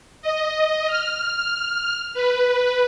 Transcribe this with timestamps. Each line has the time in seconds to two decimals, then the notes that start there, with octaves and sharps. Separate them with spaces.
0.22 D#5
0.87 F6
2.14 B4